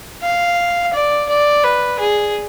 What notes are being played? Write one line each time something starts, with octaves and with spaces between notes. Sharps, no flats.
F5
D5
D5
B4
G#4